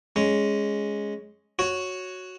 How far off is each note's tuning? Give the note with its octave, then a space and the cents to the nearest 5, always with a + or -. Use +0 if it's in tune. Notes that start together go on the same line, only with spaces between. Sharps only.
G#3 +0 C#4 +0
F#4 +0 C#5 +0